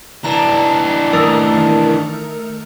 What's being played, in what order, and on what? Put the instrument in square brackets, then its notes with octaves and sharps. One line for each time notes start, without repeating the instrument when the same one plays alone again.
[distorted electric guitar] E3 D4 [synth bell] A#5
[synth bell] D#3 A3 A#4